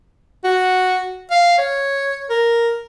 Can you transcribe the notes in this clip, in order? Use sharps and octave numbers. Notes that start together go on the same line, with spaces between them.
F#4
F5
C#5
A#4